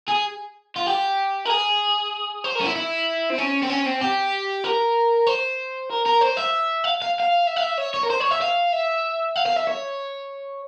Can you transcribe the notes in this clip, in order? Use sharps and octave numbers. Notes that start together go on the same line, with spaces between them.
G#4
F4
G4
A#4
G#4
C5
A#4
C#4
E4
E4
C4
C#4
C4
C#4
C4
G4
A#4
C5
A#4
A#4
C5
E5
F5
F5
F5
E5
F5
E5
C#5
C#5
A#4
C5
C#5
E5
F5
E5
F5
F5
E5
C#5